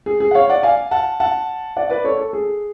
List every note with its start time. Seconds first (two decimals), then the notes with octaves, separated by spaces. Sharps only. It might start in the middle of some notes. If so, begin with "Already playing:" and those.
0.06 G#4
0.20 G#4
0.31 F#5
0.34 C#5 F5
0.49 D5 F#5
0.63 F5 G#5
0.91 F#5 A5
1.20 F#5 A5
1.77 D5 F#5
1.90 B4 D5
2.04 A4 C#5
2.18 A4
2.33 G#4